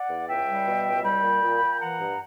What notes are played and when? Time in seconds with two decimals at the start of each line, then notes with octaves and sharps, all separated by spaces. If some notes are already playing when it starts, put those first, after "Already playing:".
Already playing: D5 F#5
0.09 E2
0.28 C#2 E5 G5
0.47 G3
0.66 B2
0.85 C#2
1.04 G3 G5 B5
1.23 A#2
1.42 A#2
1.61 A#2
1.80 E3 F#5 A#5
1.99 G2